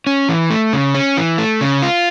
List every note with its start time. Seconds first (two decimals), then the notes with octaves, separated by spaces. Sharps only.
0.07 C#4
0.29 E3
0.50 A3
0.73 C#3
0.95 C#4
1.17 E3
1.38 A3
1.61 C#3
1.82 F4